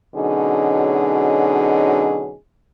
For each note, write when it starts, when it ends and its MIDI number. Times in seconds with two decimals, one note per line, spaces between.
0.15 2.34 47
0.15 2.34 50
0.15 2.34 54
0.15 2.34 61
0.15 2.34 63
0.15 2.34 68